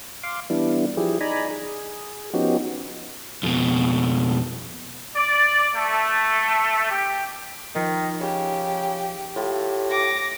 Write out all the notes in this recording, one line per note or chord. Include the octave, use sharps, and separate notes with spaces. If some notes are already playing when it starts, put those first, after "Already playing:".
F5 C6 D6
E3 G3 B3 D4 E4
F3 E4 G4 G#4
D#4 D5 G#5 A#5 B5
G#4
F3 B3 C#4 D#4 F#4 G4
F2 B2
D5
A3
G4
D#3 F3 D#4
C#3 G4
A2 F4 G4
D6 A#6